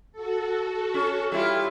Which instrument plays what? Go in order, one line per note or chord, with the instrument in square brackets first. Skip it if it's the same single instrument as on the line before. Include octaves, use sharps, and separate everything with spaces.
[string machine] F#4 A4
[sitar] C#4
G3 E4 F4